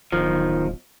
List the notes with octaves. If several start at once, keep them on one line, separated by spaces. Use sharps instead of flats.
D1 B1 D#3 F3